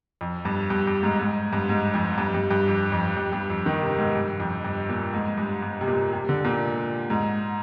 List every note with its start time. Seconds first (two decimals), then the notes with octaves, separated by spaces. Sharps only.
0.21 F2
0.45 G2
0.70 G2
0.87 G2
1.03 G#2
1.19 G#2
1.53 G2
1.69 G#2
1.94 F2
2.18 G2
2.34 G2
2.51 G2
2.68 F2
2.92 F2
3.17 G2
3.32 G2
3.50 F2
3.66 D#3
3.82 C3
3.98 G#2
4.15 G2
4.40 F2
4.64 G2
4.89 A#2
5.13 G#2
5.38 G2
5.62 G2
5.81 C3
5.87 A#2
6.13 C3
6.29 D3
6.44 A#2
7.10 G#2